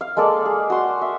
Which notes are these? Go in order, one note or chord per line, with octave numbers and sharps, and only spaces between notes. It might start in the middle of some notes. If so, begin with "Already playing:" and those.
F5
G#3 A#3 A4 D5
G#4
F#4 C6
E5